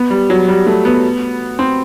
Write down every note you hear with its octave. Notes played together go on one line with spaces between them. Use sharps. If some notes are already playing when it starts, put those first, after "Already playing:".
Already playing: B3
G3
F#3
G3
A3
B3
C4